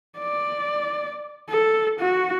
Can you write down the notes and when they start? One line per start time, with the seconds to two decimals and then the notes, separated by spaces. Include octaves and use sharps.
0.19 D5
1.50 A4
2.00 F#4